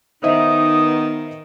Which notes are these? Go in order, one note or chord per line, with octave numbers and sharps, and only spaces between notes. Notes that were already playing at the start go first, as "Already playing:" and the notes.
D#3 B3 D#4 C5 D#5 E5 D#6